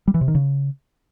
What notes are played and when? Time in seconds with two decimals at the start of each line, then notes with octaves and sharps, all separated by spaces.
0.08 G3
0.14 E3
0.21 C3
0.28 D#3
0.35 C#3